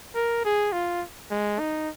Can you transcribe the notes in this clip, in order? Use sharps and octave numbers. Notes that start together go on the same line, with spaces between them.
A#4
G#4
F4
G#3
D#4